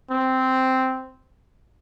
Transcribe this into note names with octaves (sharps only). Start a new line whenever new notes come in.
C4